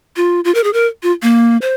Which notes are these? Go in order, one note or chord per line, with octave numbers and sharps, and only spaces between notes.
F4
F4
A#4
G#4
A#4
F4
A#3
C5